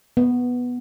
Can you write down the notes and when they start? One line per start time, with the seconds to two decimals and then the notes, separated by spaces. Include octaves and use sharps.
0.17 B3